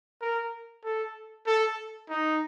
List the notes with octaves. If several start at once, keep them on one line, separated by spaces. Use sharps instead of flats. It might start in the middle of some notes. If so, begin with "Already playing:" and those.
A#4
A4
A4
D#4